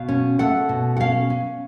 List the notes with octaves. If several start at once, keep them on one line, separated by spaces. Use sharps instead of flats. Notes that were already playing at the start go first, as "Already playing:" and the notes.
Already playing: B2 F5
C#4
A3 F#5
B2
F#5
C#4 F5
C#4